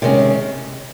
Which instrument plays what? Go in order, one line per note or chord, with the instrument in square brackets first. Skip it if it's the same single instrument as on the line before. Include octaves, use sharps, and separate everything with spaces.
[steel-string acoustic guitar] C3 D#3 G#3 C#4